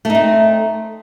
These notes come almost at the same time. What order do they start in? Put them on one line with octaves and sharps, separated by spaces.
A3 D#4 C4